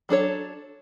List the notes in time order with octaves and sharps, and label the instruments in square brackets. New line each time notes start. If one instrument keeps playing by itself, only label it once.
[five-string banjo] F#3 D4 A4 C#5